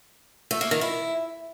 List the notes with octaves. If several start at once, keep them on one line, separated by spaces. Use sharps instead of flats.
A3
A#3
D#3
E4